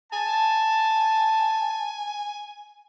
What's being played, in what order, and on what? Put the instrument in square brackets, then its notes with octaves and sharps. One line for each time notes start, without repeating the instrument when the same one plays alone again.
[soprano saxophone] G#5 [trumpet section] A5